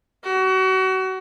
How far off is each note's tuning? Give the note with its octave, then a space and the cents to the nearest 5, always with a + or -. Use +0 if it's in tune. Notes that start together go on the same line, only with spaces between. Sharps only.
F#4 +30